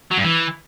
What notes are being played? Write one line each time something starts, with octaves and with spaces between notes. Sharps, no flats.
F#3
G2
E3